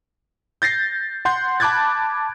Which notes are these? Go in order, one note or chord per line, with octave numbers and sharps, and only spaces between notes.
G6 A6 A#6 C7
F#5 C6 G6
A5 B5 D6 F#6 G#6 A6